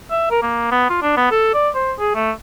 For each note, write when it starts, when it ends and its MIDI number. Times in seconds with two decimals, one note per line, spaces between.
0.11 0.26 76
0.31 0.40 70
0.42 0.71 58
0.71 0.86 59
0.89 0.97 65
1.02 1.12 62
1.17 1.28 59
1.31 1.49 69
1.54 1.69 74
1.75 1.92 72
1.99 2.11 68
2.15 2.31 57